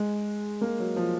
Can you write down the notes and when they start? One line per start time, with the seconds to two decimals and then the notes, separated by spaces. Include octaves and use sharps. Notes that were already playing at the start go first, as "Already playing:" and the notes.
Already playing: G#3
0.61 A#3
0.79 F#3
0.96 F3